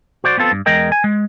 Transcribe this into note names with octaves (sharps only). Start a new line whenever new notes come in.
F#4 C5 D5
B3 C4 F4 A4
G2
E2 G#3 A#4 D#5 G5
G#5
G#3